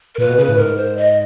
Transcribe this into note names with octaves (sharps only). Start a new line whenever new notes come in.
A#4
A#2 B4
B2
C#3 B4
A2
G#2 A#4
C5
D#5